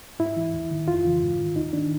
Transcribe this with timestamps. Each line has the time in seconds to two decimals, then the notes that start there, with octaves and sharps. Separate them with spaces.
0.19 G#2 E4
0.37 E3
0.54 D#2
0.71 D#3
0.88 F2 F4
1.05 C#3 E3
1.22 G#2
1.39 D#3
1.56 D#2 D#4
1.73 D#3 D4